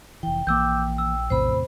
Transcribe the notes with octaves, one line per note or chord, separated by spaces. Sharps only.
F1 E3 G5
A#1 E3 A#3 D6 E6 G6
E6
E2 A2 C3 C5 B5